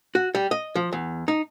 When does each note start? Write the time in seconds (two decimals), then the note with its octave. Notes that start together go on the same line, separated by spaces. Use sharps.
0.15 F#4
0.35 G3
0.51 D#5
0.75 F3
0.93 E2
1.28 D#4